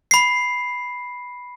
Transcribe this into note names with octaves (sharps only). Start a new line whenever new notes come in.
B5 C7